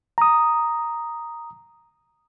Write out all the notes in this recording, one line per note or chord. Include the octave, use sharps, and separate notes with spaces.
A#5 D#6